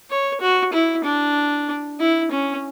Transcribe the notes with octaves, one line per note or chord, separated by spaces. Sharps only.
C#5
F#4
E4
D4
E4
C#4